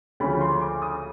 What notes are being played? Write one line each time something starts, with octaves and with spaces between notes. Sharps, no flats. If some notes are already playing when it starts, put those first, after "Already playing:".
D2 C#3 F3 B5
C6
D6
D#6